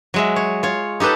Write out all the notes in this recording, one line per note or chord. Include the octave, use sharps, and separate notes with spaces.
F#3 G#3 E5
C#5
F4 C#5
D#4 G4 A4 B4 A5